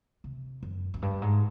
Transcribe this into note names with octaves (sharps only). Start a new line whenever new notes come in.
C3
F#2
F#2
G2
G#2